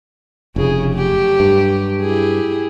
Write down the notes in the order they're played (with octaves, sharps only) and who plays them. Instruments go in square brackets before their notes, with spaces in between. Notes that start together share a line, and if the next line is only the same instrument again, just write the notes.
[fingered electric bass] F1 [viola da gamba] C#3 G#4
[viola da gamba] F#3 A3 G4
[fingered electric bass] G2
[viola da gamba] E4 G4 G#4